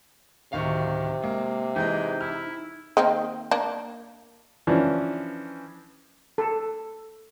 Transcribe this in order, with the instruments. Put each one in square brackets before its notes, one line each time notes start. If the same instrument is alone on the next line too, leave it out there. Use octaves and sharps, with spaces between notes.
[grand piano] D1 D#3 C#6 [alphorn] C3 [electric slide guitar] F#4 F5
[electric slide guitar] G#3 [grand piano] A#3
[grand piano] E3 G#3 D#5 [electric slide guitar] D#4 [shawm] G5
[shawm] E4 [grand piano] F6
[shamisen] D#3 A#3 C4
A#3 D4
[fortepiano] E3 F3 C#4 D4
[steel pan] A4